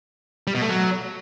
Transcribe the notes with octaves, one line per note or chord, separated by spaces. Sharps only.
G3
B2
A3
F#3